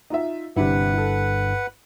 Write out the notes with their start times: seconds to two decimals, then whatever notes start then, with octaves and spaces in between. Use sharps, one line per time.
0.10 D#4 F4 E5
0.56 G1 G2 C3 D4 E4 B4 F#5
0.94 E4 A4